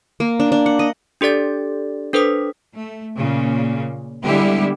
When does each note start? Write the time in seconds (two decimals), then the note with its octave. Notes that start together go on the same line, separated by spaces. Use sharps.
0.20 A#3
0.40 D4
0.52 D4
0.66 F#5
0.79 D#5
1.21 D4 G4 A4 D5 A6
2.13 D4 A4 B4 C5 D#6 B6
2.73 A3
3.16 A#2 C#3
4.22 D3 G3 G#3 B3 E4 G4